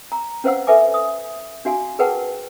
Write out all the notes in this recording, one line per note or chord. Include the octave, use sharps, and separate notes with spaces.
A#5
C#4 B4 C5 F5 F#5 E6
A4 B4 E5 G#5 D6
D#6
D4 F#4 F5 G#5
G#4 A#4 B4 F#5 G5 A5